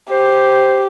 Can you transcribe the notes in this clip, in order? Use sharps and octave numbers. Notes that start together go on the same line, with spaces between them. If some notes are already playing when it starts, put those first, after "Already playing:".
G4 C5